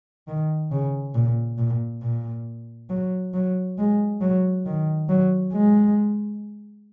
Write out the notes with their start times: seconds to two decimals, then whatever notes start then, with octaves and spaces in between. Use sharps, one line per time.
0.28 D#3
0.71 C#3
1.15 A#2
1.58 A#2
2.03 A#2
2.90 F#3
3.34 F#3
3.78 G#3
4.21 F#3
4.66 D#3
5.09 F#3
5.53 G#3